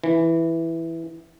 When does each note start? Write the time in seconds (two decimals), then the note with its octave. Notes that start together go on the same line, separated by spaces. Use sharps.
0.04 E3